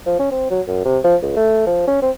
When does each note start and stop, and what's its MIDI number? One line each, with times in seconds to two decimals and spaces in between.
0.06 0.19 53
0.19 0.27 61
0.31 0.49 60
0.50 0.61 54
0.68 0.83 42
0.85 0.98 48
1.04 1.16 53
1.22 1.35 37
1.36 1.62 57
1.67 1.84 53
1.87 1.99 61
2.02 2.10 60